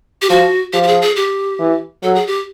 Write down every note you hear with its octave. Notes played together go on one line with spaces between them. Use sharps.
G4
F3 F#4
F3 G4
G4
G#4
G#4
G4
E3
F#3 A4
G#4
G4